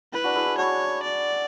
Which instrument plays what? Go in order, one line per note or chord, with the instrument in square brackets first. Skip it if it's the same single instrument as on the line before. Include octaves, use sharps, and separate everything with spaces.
[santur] E4 [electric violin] B4
[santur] D4 F#4
E4 G#4
E4
[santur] D4 F#4 [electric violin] C#5
[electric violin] D5